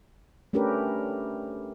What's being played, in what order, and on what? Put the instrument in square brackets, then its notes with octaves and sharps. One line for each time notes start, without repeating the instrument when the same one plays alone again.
[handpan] A3 C#4 D4 G4 A#4 B4